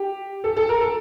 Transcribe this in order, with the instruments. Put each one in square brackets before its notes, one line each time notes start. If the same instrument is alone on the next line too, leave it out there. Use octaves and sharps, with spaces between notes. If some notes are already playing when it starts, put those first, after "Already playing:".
Already playing: [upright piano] G4
A4
A4
A#4
A4